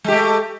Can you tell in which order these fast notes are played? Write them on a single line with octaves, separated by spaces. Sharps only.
G#3 G4 A3